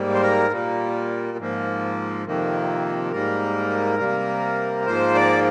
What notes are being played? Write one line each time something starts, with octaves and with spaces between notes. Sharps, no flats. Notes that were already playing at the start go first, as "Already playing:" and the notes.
Already playing: G#2 G3 A#3
C5
A#4
A#2 G3 A#3
G#2 F3 A#3
F2 C3 D#3 A#3
G#2 G3 A#3 A#4
C3 G3 A#3
G#2 F3 A#3 C5
D5